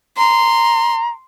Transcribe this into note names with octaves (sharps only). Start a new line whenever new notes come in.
A#5 C6